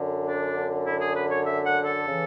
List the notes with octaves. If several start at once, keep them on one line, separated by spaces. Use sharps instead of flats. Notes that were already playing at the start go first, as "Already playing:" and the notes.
Already playing: F#2 D3
D4
E4
G#4
B4
C#5
E5
F#5
A4
C#3 E3